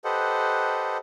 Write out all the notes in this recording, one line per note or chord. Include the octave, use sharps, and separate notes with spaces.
G4 A4 B4 C5 D#5 F#5